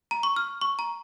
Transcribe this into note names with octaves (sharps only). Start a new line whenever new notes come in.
A#5
C#6
F6
C#6
A#5